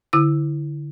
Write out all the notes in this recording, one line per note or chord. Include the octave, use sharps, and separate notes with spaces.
D3 E4 E6